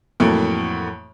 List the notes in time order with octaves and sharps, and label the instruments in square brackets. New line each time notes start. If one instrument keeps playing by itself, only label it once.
[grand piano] F2 A2 E3 F#3 A3 A#3